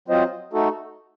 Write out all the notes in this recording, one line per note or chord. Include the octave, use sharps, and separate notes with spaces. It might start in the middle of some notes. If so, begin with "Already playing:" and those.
F#3 C4 F4 C5 D#5
A3 D#4 F#4 A4